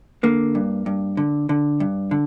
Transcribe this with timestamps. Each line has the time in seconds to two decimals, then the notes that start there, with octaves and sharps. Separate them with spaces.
0.23 D3 A#3
0.55 G2
0.86 G2
1.17 D3
1.49 D3
1.80 G2
2.11 D3